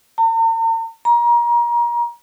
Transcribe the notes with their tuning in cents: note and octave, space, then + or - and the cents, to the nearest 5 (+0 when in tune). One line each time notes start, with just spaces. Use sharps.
A#5 -45
A#5 +30